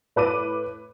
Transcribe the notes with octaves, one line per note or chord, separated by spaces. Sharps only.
A2 B4 D6 D#7